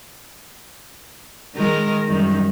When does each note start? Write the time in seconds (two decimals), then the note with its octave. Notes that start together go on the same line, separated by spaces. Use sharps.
1.55 D#3 G#3 A#4
2.06 F#2 D#3 G3